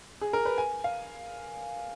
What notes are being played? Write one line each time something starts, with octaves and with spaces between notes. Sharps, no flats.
G#4
A#4
B4
G#5
F5